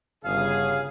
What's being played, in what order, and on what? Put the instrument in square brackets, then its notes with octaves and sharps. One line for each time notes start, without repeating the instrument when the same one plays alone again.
[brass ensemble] G1 C#3 G#4 [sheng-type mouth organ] F5